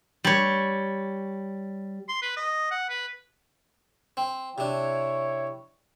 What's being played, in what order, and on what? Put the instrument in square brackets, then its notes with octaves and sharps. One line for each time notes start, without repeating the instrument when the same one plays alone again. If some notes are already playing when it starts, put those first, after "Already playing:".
[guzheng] G3 C#5
[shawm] C6
B4
D#5
F#5
B4
[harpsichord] C4
[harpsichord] C3 D4 [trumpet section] E4 C#5